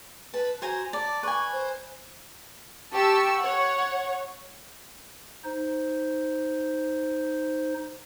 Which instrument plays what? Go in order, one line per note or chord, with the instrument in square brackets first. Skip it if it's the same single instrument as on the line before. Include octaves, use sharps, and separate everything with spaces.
[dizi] B4 [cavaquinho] A5
[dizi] F#4 [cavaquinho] C5 G#5 A#5
[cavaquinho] D5 [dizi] A5
[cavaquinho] B4 G#5 [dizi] C#6
[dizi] C5
[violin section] G4 A5 C#6 E6
C#5 F#5
[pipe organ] D#4 C5